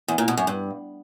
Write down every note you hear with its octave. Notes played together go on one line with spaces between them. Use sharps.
E2
A#2
B2
F#2
G2